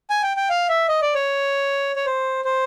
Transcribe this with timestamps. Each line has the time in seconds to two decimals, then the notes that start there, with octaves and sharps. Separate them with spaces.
0.10 G#5
0.23 G5
0.37 G5
0.50 F5
0.69 E5
0.88 D#5
1.02 D5
1.15 C#5
1.96 C#5
2.06 C5
2.45 C5